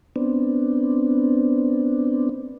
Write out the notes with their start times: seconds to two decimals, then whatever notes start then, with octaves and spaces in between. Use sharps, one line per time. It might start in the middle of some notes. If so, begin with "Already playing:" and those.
0.16 B3 C4 D4